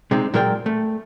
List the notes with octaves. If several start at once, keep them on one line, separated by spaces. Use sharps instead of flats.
C3 G#3 C4 D#4
A#2 F#3 G#3 A#4 D5 G5
A3